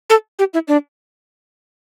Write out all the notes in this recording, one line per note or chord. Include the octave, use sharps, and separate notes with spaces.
A4
G4
E4
D4